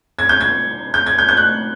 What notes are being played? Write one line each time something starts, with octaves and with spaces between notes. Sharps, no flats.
G#6
G6
G#6
G6
G#6
G6
G6
F#6